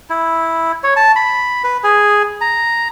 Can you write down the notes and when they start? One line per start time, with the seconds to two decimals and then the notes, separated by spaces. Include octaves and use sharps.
0.10 E4
0.83 C#5
0.96 A5
1.16 B5
1.64 B4
1.84 G#4
2.41 A#5